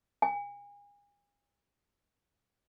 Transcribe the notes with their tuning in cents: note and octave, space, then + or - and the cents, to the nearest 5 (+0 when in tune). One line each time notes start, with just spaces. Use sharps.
G#5 -35